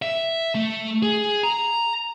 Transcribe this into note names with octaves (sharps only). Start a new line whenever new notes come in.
E5
A3
G#4
A#5